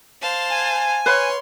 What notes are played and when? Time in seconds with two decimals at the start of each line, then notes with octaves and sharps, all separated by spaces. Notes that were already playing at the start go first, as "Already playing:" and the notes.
0.21 C5 F5 A5
0.51 G#5
1.06 B4 C#5 F5 B5 C6